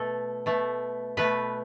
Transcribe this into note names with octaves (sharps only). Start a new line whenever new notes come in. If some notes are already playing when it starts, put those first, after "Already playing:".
Already playing: B2 A3 A4
B2 A3
B2 A3 B4